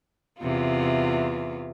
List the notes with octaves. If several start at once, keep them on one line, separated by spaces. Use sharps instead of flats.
E2 C3 F4